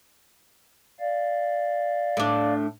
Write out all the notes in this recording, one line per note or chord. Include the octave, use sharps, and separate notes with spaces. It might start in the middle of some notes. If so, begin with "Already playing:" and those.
D5 F5
A2 D4